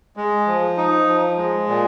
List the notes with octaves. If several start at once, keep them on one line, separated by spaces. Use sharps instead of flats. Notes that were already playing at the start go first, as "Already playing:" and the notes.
G#3
F3
D#4
F3
G#3
A#2